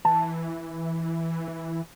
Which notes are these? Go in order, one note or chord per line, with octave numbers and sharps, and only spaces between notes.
E3 A5